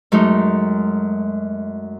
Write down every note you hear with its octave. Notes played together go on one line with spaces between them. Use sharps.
F#2 G#3 A3 D#4